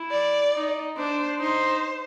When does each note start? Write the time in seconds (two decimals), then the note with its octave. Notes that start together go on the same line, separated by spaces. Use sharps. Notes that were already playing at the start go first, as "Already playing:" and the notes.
Already playing: E4
0.11 D5
0.54 D#4
0.97 D4 C5
1.40 D#4 C5